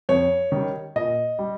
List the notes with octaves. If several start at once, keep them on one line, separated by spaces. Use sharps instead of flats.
F2 C#5
D#3 G3
A#2 D#5
G3